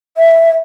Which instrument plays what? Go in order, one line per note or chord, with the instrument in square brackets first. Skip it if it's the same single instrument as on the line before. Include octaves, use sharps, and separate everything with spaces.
[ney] E5